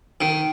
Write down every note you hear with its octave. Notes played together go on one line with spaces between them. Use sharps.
D#3